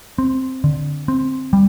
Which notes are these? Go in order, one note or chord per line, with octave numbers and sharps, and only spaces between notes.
C4
D3
C4
G3